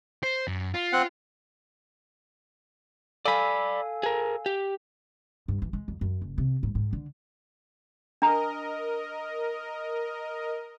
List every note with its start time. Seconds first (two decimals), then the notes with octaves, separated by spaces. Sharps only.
0.23 C5
0.48 F#2
0.74 F4
0.93 C4 F#5
3.25 A4 D5 F5 G#5 B5
4.03 G#4 A#4
4.46 G4
5.48 G2
5.62 E3
5.73 G#3
5.88 F2
6.01 F#2
6.21 F#1
6.38 C3
6.63 G#2
6.75 G#2
6.93 D3
8.22 D4 A#4 D#5 A#5